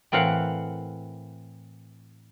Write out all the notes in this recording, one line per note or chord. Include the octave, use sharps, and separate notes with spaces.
A2 E3 C4 A#4 F5 F#5